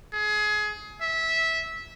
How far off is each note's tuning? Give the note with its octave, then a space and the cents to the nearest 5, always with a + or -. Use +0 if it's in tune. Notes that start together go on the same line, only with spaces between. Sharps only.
G#4 +25
E5 -15